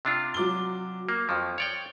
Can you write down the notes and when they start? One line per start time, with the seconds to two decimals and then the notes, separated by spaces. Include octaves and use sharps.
0.05 C3 D4 F4
0.34 F#3 D6 G7
1.09 A#3
1.29 F2 F3 C#6
1.58 C#5 D5 G5